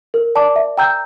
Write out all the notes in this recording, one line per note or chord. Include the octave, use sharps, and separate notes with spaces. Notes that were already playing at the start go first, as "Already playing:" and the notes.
A#4
D5 A5 D6
E5
G5 A#5 E6 G6